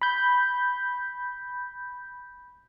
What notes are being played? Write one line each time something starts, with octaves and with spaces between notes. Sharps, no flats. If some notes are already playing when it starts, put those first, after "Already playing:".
B5 G6